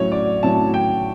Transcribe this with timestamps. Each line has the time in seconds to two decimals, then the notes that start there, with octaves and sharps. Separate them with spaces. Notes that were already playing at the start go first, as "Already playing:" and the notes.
Already playing: A2 F#3 C#4 C#5
0.12 D5
0.43 A2 F#3 C#4 A5
0.74 G5